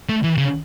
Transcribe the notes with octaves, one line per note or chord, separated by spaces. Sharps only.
A3
E3
C#3